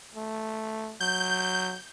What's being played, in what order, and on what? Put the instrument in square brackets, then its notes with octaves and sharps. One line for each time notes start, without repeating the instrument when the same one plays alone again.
[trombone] A3
[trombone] F#3 [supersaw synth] G6